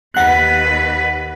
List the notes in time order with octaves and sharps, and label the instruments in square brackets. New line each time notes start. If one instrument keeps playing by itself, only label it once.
[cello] D#2 B4 [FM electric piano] F#5 F#6